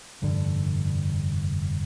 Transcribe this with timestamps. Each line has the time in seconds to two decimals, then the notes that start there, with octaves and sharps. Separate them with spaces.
0.22 F1 G2 D3